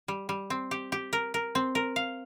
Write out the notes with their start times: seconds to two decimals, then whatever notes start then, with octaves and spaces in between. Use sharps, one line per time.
0.08 G3
0.29 G3
0.50 C4
0.71 G4
0.92 G4
1.13 A#4
1.34 A#4
1.55 C4
1.75 A#4
1.96 F5